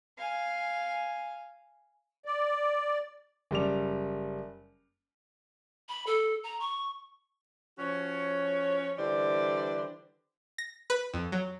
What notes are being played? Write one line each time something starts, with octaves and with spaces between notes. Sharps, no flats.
F5 G#5
D5
F#1 G3 D5 F7
B5
A4
A#5
C#6
F3 C#4 F#4 C#5
D3 E3 G3 C5 D5
A#6
B4
F2
F#3